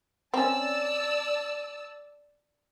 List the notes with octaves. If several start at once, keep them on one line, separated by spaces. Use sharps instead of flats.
C4 C#4 D5 A5 E6